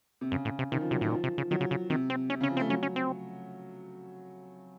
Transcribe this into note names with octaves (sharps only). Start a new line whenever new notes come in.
C3
F#2 C#3
A2
C3
C3 D#3
F3
C3 F#3
A2 D#3
A#2 F3
C3
C#3
D#3 F#3
C#3
C#3
C3 D#3
C4
C3 C#4
C#3
C#4
F3
C4
A3
F#3 C#4
C#4
C4